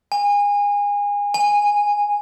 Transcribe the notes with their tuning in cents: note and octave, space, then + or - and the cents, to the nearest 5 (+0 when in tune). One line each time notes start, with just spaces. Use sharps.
G#5 -30
G#5 -10